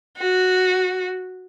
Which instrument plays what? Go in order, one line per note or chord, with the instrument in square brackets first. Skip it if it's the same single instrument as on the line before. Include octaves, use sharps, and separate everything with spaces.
[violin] F#4